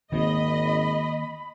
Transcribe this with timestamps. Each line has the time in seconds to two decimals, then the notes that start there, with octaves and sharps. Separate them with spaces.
0.12 G#1 D#3 A#3 D#5 B5